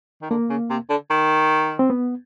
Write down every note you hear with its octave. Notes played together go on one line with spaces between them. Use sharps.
D#3
D3 A#3
C#3
C3
D3
D#3
C4
B3